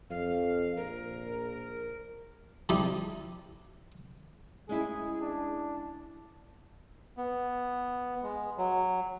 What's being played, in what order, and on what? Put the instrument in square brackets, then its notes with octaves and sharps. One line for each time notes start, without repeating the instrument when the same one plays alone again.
[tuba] F2 [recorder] F5
[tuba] A#1 [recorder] A#4
[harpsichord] C3 F3 G3 D#4 E4 G4
[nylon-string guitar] G#3 C#4 E4 [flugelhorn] G#4
[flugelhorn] D4
[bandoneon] B3
G#3
F#3